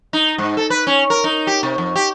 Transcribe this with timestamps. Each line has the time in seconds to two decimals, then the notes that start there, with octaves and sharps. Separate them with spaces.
0.13 D#4
0.38 G#2
0.57 A4
0.70 B4
0.87 C#4
1.10 A#4
1.24 D#4
1.47 G4
1.63 C3
1.78 F2
1.96 G4